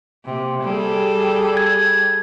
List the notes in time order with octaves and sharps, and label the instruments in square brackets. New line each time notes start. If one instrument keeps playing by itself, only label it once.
[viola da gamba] C3 A#3
G3 G#4 A4
[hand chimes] G#6